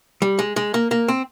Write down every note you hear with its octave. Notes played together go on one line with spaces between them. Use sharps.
G3
G#3
G#3
A#3
A#3
C4